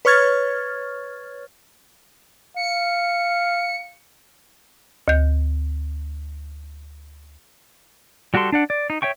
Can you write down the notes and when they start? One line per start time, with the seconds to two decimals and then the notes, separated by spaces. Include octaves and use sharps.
0.05 B4 C#5 C#6 F6 G#6 A6
2.56 F5 C#7
5.08 D2 G6
8.34 G3 F#4 G4 A4 C6
8.52 D4 D5 F#5
8.70 D5
8.90 D#4
9.02 C#5 E5 G5 C#6